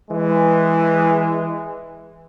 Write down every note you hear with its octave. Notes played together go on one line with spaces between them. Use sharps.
E3 G#3